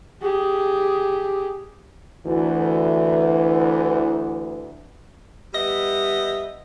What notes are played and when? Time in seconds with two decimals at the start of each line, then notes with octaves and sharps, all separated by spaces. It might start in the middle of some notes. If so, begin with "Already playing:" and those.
0.22 G4 G#4
2.27 D2 E3
5.54 G3 B3 D#5 E5